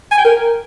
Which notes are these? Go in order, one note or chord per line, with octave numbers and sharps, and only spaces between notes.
G#5
G5
A#4